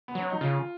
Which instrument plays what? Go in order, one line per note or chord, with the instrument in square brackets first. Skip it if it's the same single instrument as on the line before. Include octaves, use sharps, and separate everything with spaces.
[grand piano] B3
[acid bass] F#3 [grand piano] C#4
[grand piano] D#4
[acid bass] C#3 [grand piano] F4